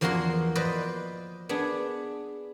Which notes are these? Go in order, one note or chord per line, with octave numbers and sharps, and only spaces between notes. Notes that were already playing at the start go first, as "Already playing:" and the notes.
E2 F3 A#3 F#4 A#4 C6
B4 C5 D5 D#5
B3 D4 G#4